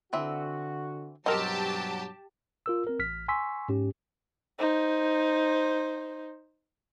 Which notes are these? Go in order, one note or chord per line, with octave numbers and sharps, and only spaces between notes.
D3 E3 C4 F#4 E5
G2 B2 F#3 C4 G4 A#4 D#5 A5
F4 A#4 E6
C4 A#4
A1 F6 B6
G#5 C6 C#6 E6 B6
G#2 C#4 G4
D#4 C5